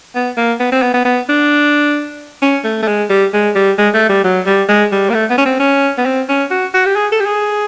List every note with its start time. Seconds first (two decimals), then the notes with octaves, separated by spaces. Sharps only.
0.15 B3
0.37 A#3
0.60 B3
0.72 C4
0.82 B3
0.94 B3
1.05 B3
1.29 D4
2.42 C#4
2.64 A3
2.82 A3
2.88 G#3
3.10 G3
3.33 G#3
3.55 G3
3.78 G#3
3.94 A3
4.09 G3
4.24 F#3
4.47 G3
4.69 G#3
4.92 G3
5.10 A#3
5.14 A3
5.30 B3
5.38 C#4
5.46 C4
5.60 C#4
5.98 B3
6.05 C4
6.29 C#4
6.51 F#4
6.74 F#4
6.86 G4
6.96 G#4
7.12 A4
7.20 G4
7.26 G#4